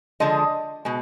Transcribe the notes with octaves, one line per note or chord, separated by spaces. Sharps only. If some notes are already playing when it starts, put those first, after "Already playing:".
D3 F3 G#3 D#5
B2 G#3